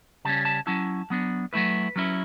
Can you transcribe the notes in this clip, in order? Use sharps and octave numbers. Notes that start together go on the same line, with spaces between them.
C#3 G3 C#4 A5
A5
F#3 C#4 E4 A5
F#3 B3 D4
F#3 A3 E4 B4
F#3 C#4 E4